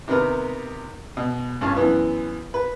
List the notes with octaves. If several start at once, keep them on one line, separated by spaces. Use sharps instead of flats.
C3 D#3 B3 A#4 B4
B2
G2 C#4 F4 A5
F#2 E3 B3
B4